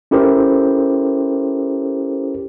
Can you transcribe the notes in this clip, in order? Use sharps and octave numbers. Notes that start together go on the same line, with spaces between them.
C#4 E4 G4 A4 A#4 C5